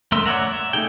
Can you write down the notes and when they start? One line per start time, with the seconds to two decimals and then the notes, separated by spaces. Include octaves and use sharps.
0.12 A3 A#4 E5 C6 E6
0.26 C#5 D5 E5 F#5 A#5
0.46 E5
0.73 A3 D#4 G#4 G5